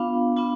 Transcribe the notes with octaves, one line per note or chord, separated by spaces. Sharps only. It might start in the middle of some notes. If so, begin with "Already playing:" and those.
Already playing: B3 D4 F4 F5
B3 D4 F4